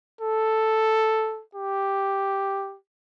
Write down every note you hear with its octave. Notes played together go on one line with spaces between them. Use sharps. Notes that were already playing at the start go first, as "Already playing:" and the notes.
A4
G4